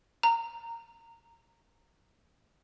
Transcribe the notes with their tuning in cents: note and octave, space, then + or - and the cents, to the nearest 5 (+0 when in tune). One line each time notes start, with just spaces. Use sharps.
A#5 -15